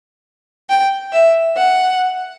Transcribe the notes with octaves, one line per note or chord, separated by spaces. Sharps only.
G5
E5
F#5